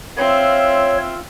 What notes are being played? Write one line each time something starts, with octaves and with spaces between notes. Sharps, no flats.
C4 F4 C#5 E5